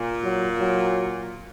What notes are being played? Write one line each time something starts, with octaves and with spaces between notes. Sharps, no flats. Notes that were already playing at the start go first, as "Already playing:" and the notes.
Already playing: A#2
F#3
F#3